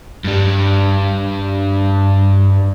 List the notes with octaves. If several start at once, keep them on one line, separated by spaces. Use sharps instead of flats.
G2 G3